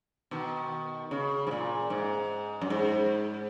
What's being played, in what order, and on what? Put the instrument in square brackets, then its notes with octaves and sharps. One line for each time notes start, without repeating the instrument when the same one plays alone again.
[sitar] B2 D#3
C#3
G#2
A#2
G#2
F#2
G#2